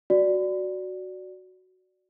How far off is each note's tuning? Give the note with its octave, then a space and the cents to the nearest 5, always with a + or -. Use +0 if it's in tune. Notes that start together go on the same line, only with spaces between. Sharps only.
F#4 +0 D5 +0